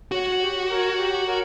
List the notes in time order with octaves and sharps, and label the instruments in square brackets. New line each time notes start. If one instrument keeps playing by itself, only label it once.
[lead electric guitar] F#4 [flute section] C#5 F#5
[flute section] G4
A#4 C#5 F#5
G4
A#4 C#5 F#5